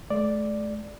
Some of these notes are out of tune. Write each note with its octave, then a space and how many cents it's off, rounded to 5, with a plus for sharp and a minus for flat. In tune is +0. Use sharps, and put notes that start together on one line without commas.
A3 -40 D5 +0